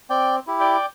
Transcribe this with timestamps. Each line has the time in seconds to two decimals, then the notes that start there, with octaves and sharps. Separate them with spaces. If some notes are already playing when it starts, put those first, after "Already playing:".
0.10 C4 D5 G5
0.47 E4 G4
0.60 D5 G5